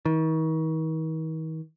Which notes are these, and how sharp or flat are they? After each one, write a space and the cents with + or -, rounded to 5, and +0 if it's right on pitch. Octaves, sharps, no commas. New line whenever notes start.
D#3 +40